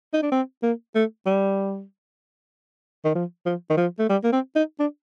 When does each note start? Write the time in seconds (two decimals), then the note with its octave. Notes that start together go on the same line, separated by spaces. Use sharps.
0.13 D#4
0.22 D4
0.32 C4
0.63 A#3
0.95 A3
1.26 G3
3.04 D#3
3.15 F3
3.45 F3
3.70 D#3
3.77 F3
3.99 A3
4.09 G3
4.24 A#3
4.32 C4
4.55 D#4
4.79 D4